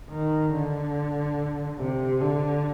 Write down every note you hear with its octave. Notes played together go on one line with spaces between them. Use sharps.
D#3
D3
C3
D3